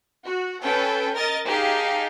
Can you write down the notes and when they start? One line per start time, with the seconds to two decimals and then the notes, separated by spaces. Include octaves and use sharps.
0.22 F#4
0.62 C#4 A4 B4 G5
1.14 A#4 D#5 A6
1.47 D#4 G4 G#4 F5 A5